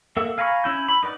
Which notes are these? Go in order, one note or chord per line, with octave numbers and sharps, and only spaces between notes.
A#3 A4 E5 F#5 E6
F5 G#5 A#5 B5 C#6
C#4 E4 G6
B5
D#4 B4 D5 F#5